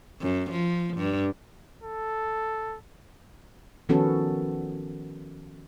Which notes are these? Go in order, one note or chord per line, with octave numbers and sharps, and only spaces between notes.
F#2
F3
G2
A4
D#3 F3 B3 C#4 F#4 A4